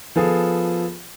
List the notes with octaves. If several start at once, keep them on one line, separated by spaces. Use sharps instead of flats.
F3 B3 F4 G#4 A4